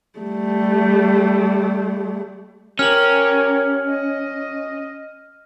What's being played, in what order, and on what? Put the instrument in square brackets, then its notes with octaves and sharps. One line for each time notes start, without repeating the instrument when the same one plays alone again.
[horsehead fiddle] G3 A3
[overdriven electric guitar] C#4 [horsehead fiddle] G4 A#4 [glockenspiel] F6 F#7
[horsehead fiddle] D#5